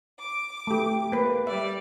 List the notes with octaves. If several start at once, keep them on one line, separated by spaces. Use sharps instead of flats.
D6
A3 G4
A#3 B4
G3 D5 E5